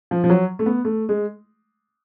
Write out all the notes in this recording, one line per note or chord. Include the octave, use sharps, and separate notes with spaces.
F3
F3
F#3
A3
B3
A3
G#3